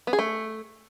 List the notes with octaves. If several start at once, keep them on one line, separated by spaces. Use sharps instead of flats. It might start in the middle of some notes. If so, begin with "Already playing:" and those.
B3
G#4
A3